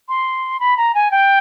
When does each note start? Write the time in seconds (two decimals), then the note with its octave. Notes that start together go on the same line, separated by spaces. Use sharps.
0.09 C6
0.60 B5
0.77 A#5
0.95 G#5
1.11 G5